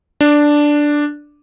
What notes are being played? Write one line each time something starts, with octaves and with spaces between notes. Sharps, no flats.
D4